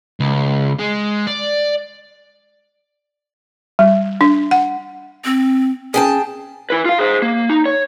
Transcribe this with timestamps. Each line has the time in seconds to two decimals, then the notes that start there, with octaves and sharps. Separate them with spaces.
0.20 C#2
0.79 G#3
1.27 D5
3.79 G3
4.21 D4
4.51 F#5
5.25 C4
5.94 C#4 G#4 G5 A5
6.70 E4 B4
6.85 F4 F5
6.98 G#4 C5
7.22 A#3
7.50 D#4
7.66 C#5